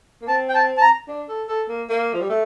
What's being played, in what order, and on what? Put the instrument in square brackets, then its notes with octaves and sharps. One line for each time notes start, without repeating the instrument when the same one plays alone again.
[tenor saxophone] A#3
[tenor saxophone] C4 [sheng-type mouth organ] A5
[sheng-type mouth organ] G5
A5
A5
A#5
[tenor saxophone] D4
A4
A4
A#3
A#3
F3
G3
A3